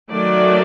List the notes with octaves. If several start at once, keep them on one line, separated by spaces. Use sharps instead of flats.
D#3 F#3 A3 D5